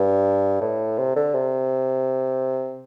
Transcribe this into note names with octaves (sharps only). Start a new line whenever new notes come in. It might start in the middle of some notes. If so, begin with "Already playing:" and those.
Already playing: G2
A2
C3
D3
C3